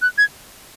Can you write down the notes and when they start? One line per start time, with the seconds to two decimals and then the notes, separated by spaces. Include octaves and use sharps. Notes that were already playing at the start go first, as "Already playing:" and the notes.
0.02 F#6
0.18 G#6